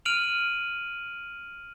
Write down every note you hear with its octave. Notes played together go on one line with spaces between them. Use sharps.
F6 D7 D#7 F7 F#7